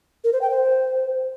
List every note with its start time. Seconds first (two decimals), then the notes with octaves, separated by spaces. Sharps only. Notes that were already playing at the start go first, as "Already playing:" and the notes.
0.24 A#4
0.33 C5
0.41 G5
0.50 C5